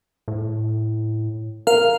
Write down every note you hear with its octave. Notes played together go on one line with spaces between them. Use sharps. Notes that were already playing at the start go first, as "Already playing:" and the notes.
A2
A#4 F5